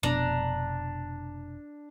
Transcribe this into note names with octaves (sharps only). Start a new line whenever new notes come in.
F1 B2 D4 A#5